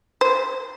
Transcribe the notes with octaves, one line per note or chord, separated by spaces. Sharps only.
C5